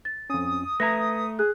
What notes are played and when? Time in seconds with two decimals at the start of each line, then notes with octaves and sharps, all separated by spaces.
0.05 A6
0.30 F2 C#4 D#6
0.80 A3 B4 E5 A#5 G#6 A#6
1.39 G#4 F#6